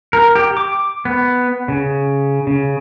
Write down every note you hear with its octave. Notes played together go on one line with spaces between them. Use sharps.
A#4
G4
D6
B3
C#3
C#3